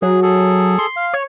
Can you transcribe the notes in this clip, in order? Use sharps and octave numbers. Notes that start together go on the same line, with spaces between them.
F#3 G#4
G#4 A4
C6
F5
C#5